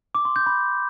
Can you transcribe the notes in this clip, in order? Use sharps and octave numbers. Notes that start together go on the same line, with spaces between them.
D6
C6
G6
B5